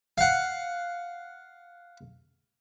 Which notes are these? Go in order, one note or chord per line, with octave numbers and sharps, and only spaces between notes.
F5 F#5